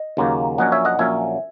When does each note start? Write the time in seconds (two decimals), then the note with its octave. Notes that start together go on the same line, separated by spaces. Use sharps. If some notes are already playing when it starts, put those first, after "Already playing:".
Already playing: D#5
0.17 D#2 C#3 F#3 A#3
0.58 A#1 A#2 F#3 C#4 D#5 F#5
0.72 C#5 E5
0.85 D#5 F#5
0.99 A#1 A#2 F#3 C#4 E5 G#5